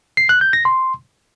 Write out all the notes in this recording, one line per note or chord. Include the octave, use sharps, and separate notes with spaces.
C7
F#6
G6
A#6
C6